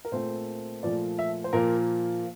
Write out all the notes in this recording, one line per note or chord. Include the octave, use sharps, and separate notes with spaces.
A#4
A#2 A3 C4 C5
A#2 F3 A3 D5
E5
C5
A#2 F3 A#3 A#4